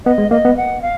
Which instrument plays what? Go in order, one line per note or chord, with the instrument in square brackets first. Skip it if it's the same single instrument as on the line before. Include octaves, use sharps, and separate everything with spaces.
[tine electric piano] B3 [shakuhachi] D#5
[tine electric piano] G#3
[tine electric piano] A#3 [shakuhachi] D#5
[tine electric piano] B3
[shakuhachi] F#5
F5